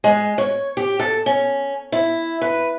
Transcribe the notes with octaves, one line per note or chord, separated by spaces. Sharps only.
G#3
C#5
G4
A4
C#4
E4
B4